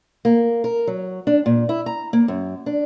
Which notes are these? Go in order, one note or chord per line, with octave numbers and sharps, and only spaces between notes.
A#3
A#4
F#3
D4
A#2
E4
A#5
A#3
F#2
D4